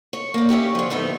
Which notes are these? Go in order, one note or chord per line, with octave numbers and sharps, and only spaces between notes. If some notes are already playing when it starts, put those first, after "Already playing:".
C#5
A#3 D5
C#4 E4 G4 C#5
D3 F3
D2 A2 B3 D#4 E4